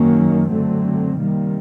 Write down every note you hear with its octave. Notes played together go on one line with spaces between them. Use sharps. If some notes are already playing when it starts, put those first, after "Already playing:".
Already playing: F#2 D#3 F#3 A#3 C#4
D3 F#3 A3 C4
C3 D#3 G3 A#3